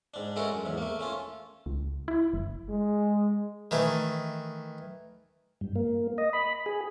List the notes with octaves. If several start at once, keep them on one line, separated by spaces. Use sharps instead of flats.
G#2 D4
G#3 A3 C#4 F#4 A4 A#4
F#2
E2 G#2
A3 A#3
A3 C#4 F4
C#2
E4
F#1
G#3
D#3 E3 A3
G2
A#3
D#5
B5
G#4